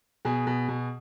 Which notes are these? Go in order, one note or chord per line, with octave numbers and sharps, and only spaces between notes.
B2 G#4
B2
B2